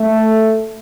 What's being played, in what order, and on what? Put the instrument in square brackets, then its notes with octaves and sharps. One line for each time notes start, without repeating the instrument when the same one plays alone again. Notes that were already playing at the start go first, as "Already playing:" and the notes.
Already playing: [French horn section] A3